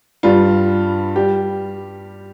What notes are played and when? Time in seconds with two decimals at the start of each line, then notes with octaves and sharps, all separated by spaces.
0.23 G2 G3 F4
1.16 G3 G4